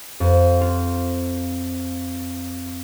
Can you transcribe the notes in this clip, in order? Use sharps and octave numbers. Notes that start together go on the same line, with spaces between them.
F2
F4